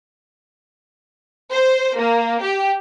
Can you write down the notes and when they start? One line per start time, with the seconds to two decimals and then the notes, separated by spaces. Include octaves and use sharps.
1.52 C5
1.97 A#3
2.41 G4